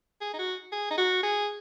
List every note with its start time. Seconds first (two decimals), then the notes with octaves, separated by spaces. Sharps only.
0.21 G#4
0.34 D#4
0.39 F#4
0.72 G#4
0.91 D#4
0.98 F#4
1.23 G#4